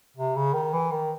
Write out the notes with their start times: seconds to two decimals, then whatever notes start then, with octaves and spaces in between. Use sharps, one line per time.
0.17 C3
0.36 C#3
0.54 D#3
0.73 E3
0.92 D#3